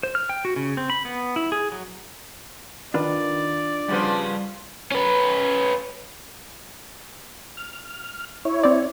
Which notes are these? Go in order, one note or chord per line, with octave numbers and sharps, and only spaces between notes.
C5
F6
G5
F#4
C#3
C4
B5
B3
E4
G#4
F#3
D#3 D4 F4 B4 D5
C#3 F3 G3 B3 C6
C#4 B4
F6
E4 C#5
C4 D5